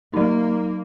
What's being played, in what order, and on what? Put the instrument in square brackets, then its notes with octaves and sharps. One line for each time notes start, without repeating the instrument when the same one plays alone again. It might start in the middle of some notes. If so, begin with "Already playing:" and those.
[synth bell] F#3 D#4 [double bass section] A#3